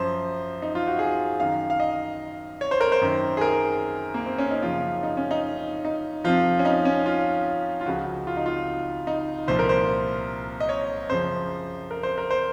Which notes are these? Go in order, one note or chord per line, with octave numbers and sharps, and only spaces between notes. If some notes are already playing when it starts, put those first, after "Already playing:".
Already playing: F#2 F3 C5
D#4
F4
F#4
G#4
F#2 D#3 F5
F5
D#5
C#5
C5
A#4
C5
F#2 D#3
G#4
A#4
A#3
C4
C#4
D#4
F#2 C#3 F3 F4
D#4
C#4
D#4
D#4
F2 C3 F3 F4
C#4
D#4
C#4
F4
F4
C#2 C#3 F3 F#4
F4
D#4
F4
D#4
C2 A#2 F3 C5
A#4
C5
D#5
C#5
F#2 C#3 F3 C5
A#4
C5
A#4
C5